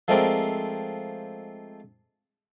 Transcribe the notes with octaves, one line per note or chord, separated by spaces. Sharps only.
F3 G#3 A3 C4 A#4 D5